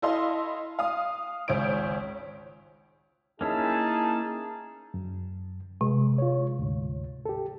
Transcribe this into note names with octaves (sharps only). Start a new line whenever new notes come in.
E4 A4 D#5 F5 C6
F5 D#6
G#1 C#2 C5 C#5 D7
A#3 C#4 D#4 E4 G#4 A5
F#2
C3 G#3
F4 C#5
D2 G#2
G4 A4